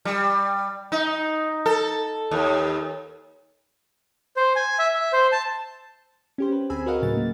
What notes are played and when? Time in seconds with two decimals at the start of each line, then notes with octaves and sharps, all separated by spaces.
0.05 G3
0.92 D#4
1.66 A4
2.31 D#2
4.36 C5
4.56 G#5
4.79 E5
4.94 E5
5.13 C5
5.32 A5
6.38 C#4 G4 C5
6.52 B4
6.70 D2 C4 G#4 G#5 B5 E6
6.86 F#4 A#4 B4 D#5 F5 F#5
7.02 A2 C#3 F#3 A6
7.17 A#3